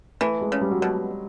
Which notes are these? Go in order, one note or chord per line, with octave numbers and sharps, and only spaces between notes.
E3 A3
G#3
C#3
G3
F#3
B2 G3